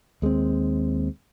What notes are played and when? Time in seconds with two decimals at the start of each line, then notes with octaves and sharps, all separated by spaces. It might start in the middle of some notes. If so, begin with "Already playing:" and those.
0.22 D#2 G#3 A3 C4